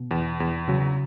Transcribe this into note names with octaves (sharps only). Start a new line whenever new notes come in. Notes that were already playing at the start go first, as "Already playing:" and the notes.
Already playing: B2
E2
E2
C#3 F#3